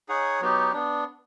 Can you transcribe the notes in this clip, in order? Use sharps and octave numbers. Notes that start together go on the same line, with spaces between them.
D#4 G#4 C#5 F#5
F#3 B3 D#4 G4
B3 D4